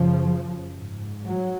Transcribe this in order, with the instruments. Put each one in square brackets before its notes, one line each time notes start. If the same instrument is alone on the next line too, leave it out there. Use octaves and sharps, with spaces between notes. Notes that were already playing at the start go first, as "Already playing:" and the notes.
Already playing: [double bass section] F#2 C#3 F3
G#2
F#3